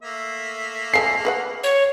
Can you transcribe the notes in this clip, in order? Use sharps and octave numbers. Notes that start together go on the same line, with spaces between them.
A3 A#3 E5
F3 G#3 A4 C7
G#4 B4 F#5
C#5